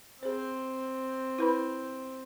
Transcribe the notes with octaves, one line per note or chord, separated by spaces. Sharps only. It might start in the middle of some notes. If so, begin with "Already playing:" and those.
C4 G#4 C5
E4 B4 B5